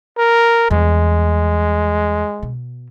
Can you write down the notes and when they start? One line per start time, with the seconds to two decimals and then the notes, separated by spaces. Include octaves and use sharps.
0.18 A#4
0.71 E2 G3 G#3
2.43 B2